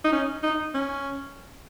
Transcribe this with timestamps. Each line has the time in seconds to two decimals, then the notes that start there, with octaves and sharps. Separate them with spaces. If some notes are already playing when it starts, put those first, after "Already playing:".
0.05 D#4
0.12 C#4
0.43 D#4
0.74 C#4